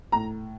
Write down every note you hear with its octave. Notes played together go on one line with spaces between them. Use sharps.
A2 A#5